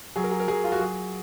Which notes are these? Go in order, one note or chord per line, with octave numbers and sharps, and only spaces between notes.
F#3 G#4
A#4
G#4
A#4
F#3 G#4
F4
F#4
F#3 G#4